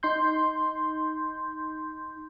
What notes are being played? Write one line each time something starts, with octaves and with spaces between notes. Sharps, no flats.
D#4 C6 G6